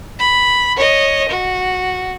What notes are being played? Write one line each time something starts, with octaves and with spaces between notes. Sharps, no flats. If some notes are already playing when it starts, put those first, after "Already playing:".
B5
C#5 D#5
F#4